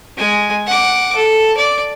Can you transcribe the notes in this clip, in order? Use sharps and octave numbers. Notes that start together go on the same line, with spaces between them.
G#3 G#5
F#5 D6
A4
D5